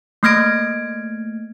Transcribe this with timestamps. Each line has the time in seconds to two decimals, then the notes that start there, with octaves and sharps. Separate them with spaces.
0.23 A3 A#3 F6 G#6 A#6 D7